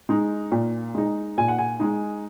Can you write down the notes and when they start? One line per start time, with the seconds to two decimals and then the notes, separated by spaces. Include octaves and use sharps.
0.09 G#3 D#4
0.52 A#2
0.95 G#3 D#4
1.38 A#2 G#5
1.48 F#5
1.58 G#5
1.80 G#3 D#4